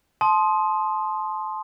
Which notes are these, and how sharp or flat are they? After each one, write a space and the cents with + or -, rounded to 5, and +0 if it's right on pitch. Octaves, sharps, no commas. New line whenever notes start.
A5 -25 C6 +0 D#6 +0